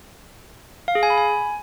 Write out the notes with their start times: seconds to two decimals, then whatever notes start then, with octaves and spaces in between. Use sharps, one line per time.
0.88 F5
0.95 G#4
1.03 G#5
1.10 B5
1.18 G#5